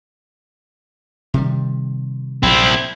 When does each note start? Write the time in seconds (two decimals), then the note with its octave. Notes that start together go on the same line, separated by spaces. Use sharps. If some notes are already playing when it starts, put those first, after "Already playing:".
1.34 C3 D#3 G3
2.43 A#1 C3 C4 E4